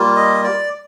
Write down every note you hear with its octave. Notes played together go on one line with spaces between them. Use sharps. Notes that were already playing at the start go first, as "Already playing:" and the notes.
Already playing: G3 A#3 F4
D#5
D5